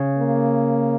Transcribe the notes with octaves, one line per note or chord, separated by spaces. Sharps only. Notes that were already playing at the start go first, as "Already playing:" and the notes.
Already playing: C#3
A#3